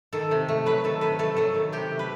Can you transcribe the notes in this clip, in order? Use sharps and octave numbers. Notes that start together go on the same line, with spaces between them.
D#3 A4
C3
A3
F#3 B4
D#3 A4
C3 B4
A3 A4
F#3 A4
D#3
C3 G4
A3
B4